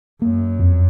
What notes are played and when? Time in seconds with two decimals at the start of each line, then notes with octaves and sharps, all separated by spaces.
0.22 F#2 A#3
0.59 F2